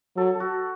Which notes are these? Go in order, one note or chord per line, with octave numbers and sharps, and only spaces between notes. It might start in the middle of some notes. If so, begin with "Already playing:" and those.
F#3 A4
A4
F#4